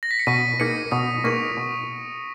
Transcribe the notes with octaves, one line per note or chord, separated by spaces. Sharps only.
A#6
B6
C#7
B2 B6 D#7
A#3 D#4 G#4 B4 A#6 C#7
B2 D#6
A#3 D#4 G#4 B4 C#6
B2